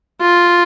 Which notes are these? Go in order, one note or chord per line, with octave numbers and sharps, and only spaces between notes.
F4